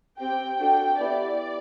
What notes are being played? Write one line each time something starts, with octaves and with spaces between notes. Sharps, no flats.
C4 G4 G5
D4 F#4 A4 G5
B3 E4 G4 D5